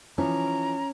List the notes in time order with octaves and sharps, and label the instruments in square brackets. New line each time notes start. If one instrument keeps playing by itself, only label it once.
[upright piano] E3 F3 [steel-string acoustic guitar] C#4 [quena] A#5